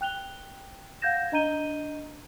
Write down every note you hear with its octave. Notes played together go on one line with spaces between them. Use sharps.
G5 F#6 F7 G7
F5 F#5 G6 G#6 A#6 E7
D4 D#5 A#5 G6 D#7 G7